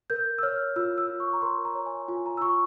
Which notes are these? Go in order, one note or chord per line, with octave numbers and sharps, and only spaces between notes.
A#4 G6
E6
C#5 F6
F4 E6
E6
F4
C#6
A#5
A#4 C6
A#5
C#5
G#5
F4 G#5
A#5
E6
F4 C#6